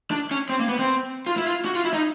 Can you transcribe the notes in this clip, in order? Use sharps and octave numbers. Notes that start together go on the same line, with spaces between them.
D4
C#4
C4
A#3
B3
C4
F4
E4
F4
F#4
F4
E4
D#4